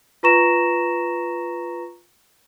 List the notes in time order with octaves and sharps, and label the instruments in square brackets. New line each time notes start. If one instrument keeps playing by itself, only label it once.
[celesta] F4 B4 A#5 C#6 A#6 E7